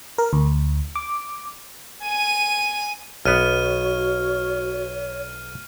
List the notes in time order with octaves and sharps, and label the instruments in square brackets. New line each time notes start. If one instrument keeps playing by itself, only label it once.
[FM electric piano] A#4
D2
D6
[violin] G#5 D#7
[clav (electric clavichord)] B1 B3 [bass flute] F#4 [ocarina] C#5 [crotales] F6 D#7